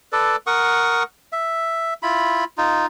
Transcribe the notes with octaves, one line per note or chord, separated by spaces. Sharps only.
A4 B4 D5
A#4 F#5 C#6 D#6
E5
E4 F4 B5
D#4 F4